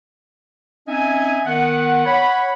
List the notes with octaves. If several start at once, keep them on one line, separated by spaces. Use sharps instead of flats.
C4 C#4 D#4 D#5 E5 G#5
D#3 B3 F#5
C#5 F#5 B5